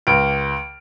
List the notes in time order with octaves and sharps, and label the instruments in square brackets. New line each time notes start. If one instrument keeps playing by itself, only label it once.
[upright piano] C#2 F6 D7